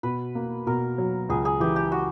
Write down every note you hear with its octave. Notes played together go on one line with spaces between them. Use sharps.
B2 B4
A#3
B2 A#4
F#3
C#2 G#4
G#4
E3 G4
G4
F#4